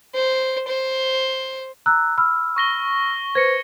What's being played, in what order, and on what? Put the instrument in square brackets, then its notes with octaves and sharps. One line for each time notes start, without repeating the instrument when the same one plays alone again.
[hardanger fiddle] C5
C5
[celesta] A#5 E6 F#6
B5 E6 F6
[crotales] C#6 A#6 G7
[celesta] B4 C5 [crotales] G#6 A#6 C#7